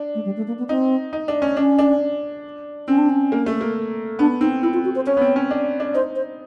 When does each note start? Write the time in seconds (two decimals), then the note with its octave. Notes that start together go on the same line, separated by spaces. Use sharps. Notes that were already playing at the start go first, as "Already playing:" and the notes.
Already playing: D4
0.15 A3
0.25 G3
0.37 A3
0.47 A#3
0.58 B3
0.69 C4 D#4
1.13 D#4
1.28 D4
1.42 C#4
1.56 C#4 D4
1.79 D4
2.88 C4 C#4
2.98 D4
3.09 C#4
3.32 A#3
3.46 A3
3.61 A#3
4.19 B3 D4
4.41 C4 D#4
4.63 C4 E4
4.73 F4
4.85 F#4
4.95 C5
5.07 C#4 C#5
5.17 B3
5.21 C4
5.36 C#4
5.51 D4
5.80 D4
5.94 D#4 C5
6.15 C5